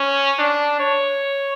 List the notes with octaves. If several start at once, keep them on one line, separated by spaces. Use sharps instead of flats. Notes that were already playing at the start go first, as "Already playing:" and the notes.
Already playing: C#4
D4
C#5